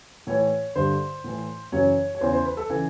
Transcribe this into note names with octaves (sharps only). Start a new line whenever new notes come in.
A2 E3 C#5
G2 D3 C5
A2 E3
F#2 C#3 E3 C#5
C#5
E2 C#3 E3 C5
C5
B4
A4
C#3 E3